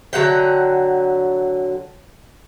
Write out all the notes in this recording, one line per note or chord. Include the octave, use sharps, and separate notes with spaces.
D3 F#3 F#5 G5